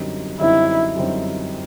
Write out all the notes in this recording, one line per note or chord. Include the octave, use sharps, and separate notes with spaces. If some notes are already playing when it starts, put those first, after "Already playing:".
Already playing: F#2 D3 G3 C4 D#4
F#2 D3 G3 C4 D#4 E4
F#2 D3 G3 C4 D#4